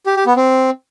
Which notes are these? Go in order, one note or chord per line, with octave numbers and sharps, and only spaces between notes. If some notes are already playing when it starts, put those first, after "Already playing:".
G4
G4
B3
C4